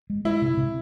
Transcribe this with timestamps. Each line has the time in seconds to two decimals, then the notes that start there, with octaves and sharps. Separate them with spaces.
0.10 G#3
0.25 G#3 E4
0.42 C3
0.57 C3